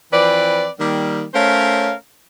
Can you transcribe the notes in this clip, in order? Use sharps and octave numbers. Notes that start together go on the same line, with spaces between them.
E3 F3 C4 B4 D5
D#3 G3 A#3
A3 C#4 A#4 C5 C#5 F5